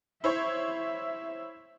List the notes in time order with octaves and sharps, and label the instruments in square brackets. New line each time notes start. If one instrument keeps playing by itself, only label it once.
[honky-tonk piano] E4 C5 C#5 [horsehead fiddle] E5